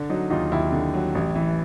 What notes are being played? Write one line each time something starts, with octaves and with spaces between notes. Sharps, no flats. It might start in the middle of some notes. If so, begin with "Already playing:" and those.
Already playing: D3
F#3 D#4
D#2 D#4 F4
D#2 E4
D3
F#3
A1
E3